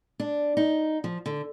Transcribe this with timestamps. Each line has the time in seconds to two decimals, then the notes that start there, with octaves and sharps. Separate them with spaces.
0.20 D4
0.57 D#4
1.04 F3
1.26 D3